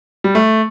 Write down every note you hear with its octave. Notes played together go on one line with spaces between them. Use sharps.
G3
A3